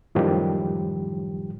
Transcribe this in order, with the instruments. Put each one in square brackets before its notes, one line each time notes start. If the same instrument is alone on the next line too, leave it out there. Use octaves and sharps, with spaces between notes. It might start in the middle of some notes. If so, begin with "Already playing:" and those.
[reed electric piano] F#2 A2 D#3 F3 G3 G4